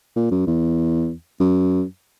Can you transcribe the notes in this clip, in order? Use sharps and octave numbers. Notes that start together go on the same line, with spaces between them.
A#2
F#2
E2
F#2